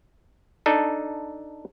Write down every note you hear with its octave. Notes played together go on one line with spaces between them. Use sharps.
D4 D#4 A4